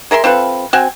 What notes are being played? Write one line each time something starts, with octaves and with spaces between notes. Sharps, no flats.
G#4 A#4 E5 C6
C4 F4 A4 B4
C4 F#4 G#5